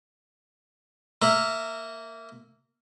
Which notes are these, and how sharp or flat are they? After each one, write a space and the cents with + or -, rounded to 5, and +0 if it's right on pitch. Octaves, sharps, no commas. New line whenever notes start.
A#3 -15 E5 +0 A#5 -20